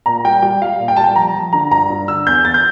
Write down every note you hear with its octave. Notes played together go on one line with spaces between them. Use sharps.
A#2 A#5
G3 G5
G3 G5
G3 F5
A#2
G5
G3 A5
G5
F3 A#5
F3
D3 A#5
G2 A#5
G2
D3 E6
E2 G6
E2 A6
G6